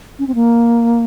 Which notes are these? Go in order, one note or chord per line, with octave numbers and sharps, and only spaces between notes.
C#4
C4
A#3